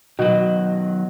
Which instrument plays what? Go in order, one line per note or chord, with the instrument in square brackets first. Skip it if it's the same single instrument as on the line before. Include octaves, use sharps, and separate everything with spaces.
[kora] B2 [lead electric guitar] D#3 F#3